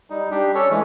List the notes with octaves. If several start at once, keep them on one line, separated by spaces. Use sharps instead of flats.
G3 D#4
G3 D4 G4
C#4 A4 C#5
E3 G#3 A3